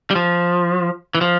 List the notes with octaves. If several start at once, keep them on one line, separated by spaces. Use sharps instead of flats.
G3
F3
E3
F3